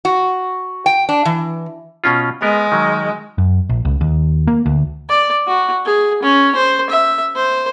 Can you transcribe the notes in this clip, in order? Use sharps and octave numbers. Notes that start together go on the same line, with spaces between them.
F#4
G5
D4
E3
B2 C#4 F4
G#3 B3 A#4
D#3 F#3
F#2
A#1
C#2
D#2
A#3
D2
D5
F#4
G#4
C#4
C5
E5
C5